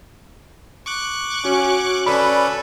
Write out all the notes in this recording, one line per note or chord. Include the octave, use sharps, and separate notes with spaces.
C#6 D6 F#6
C#4 F#4
C#4 A4 B4 D5 B5